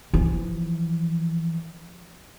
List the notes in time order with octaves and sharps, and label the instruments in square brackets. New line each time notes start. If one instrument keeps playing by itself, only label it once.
[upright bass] E3 F3